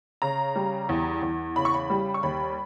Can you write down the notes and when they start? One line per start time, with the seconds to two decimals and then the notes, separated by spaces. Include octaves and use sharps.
0.22 C#3 A#5
0.56 G3
0.89 E2
1.22 E2
1.56 C#3 B5
1.65 C#6
1.74 B5
1.90 G3
2.14 C#6
2.23 D#2 B5